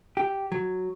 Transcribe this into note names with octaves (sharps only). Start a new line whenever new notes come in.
G4
F#3